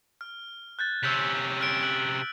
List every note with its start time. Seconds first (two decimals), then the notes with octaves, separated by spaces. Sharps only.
0.21 F6
0.79 F#6 G6 A6
1.03 C3 C#4 E6 G6 B6
1.61 F6 F#6 D7
1.83 F#6 F#7